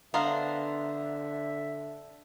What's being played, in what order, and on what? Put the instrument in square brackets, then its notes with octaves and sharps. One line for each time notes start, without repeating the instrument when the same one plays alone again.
[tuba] D3 [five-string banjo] B3 F5 [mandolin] D4 C5 A#5 [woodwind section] E5